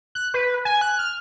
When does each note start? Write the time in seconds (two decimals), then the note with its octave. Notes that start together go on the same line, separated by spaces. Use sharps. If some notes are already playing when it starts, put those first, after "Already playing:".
0.15 F#6
0.34 B4
0.65 G#5
0.81 F#6
0.99 F6